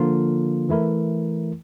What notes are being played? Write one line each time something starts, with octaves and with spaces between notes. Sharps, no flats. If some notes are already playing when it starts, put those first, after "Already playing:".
Already playing: D3 F3 A#3 F4
E3 A3 E4 A#4